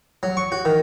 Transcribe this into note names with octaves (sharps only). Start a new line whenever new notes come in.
F#3
C#6
F#4
D#3